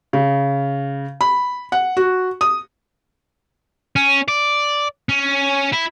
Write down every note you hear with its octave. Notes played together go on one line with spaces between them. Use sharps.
C#3
B5
F#5
F#4
D#6
C#4
D5
C#4
E4